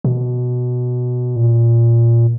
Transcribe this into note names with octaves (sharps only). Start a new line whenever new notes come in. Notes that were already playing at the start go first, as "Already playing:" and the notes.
B2
A#2